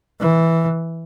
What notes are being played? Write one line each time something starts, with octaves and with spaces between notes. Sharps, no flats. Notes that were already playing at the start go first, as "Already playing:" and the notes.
E3